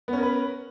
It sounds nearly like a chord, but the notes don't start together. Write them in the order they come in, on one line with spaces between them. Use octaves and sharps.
B3 C#4 A#4 B4